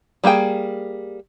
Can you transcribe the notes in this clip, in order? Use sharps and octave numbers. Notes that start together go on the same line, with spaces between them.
G3 A#3 G#4 G5